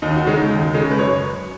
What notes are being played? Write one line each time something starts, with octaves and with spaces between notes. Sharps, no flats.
D#2 D#4
F#4
C#3 G#3 D#4
D#2
C#3 G#3
B4
F#2 C#5